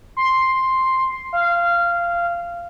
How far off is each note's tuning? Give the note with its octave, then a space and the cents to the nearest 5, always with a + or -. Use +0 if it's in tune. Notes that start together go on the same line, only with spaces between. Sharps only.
C6 +5
F5 -15